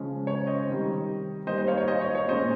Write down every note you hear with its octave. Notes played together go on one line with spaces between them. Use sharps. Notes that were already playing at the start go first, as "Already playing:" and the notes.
Already playing: C#3 F3 G#3 C#4
C#5
C5 D#5
C3 D#3 G3
D#3 G3 A#3 D#4 C5 D#5
C5 D#5
C#5 F5
C#5
C5 D#5
C#5
C#5
A#2 G#3 C#4 C5 D#5